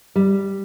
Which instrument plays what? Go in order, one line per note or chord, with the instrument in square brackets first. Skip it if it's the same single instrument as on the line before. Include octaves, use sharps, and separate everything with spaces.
[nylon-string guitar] G3